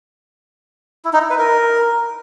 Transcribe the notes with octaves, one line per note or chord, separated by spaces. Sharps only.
E4
D#4
E4
B4
A#4